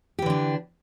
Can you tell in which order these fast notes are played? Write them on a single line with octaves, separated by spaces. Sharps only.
G4 E3 D3 D4